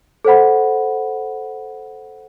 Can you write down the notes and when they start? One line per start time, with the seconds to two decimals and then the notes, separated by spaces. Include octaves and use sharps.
0.25 A4 C5 F#5 B5